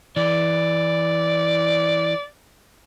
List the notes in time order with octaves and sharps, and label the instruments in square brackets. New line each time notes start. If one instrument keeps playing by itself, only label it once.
[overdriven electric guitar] E3 [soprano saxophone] D5